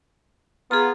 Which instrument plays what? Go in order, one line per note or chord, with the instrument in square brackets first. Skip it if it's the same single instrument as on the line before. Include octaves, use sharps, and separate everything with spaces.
[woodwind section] B3 F4 [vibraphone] G#4 A#5